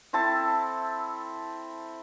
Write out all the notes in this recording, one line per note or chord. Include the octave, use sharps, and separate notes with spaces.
C4 E4 A4 A5